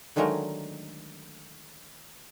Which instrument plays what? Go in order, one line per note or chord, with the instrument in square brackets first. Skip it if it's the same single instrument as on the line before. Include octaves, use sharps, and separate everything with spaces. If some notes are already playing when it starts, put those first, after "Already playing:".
[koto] D3 D#3 F#3 G#3 A3 A#4